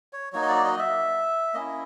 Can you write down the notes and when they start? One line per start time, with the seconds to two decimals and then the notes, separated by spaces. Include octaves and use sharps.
0.13 C#5
0.33 F#3 A#3 D#4 F#4 C#5
0.42 D#5
0.49 D5
0.64 D#5
0.79 E5
1.54 A#3 C#4 E4 D#5